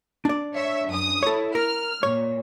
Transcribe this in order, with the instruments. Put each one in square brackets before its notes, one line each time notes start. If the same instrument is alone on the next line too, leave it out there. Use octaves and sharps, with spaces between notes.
[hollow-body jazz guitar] D4 D5
[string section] C#5 E5
F#2 D#6
[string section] E4 [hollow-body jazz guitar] A4 C#5
[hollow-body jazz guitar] A#4 [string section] F6
[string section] A#2 [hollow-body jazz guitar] C#5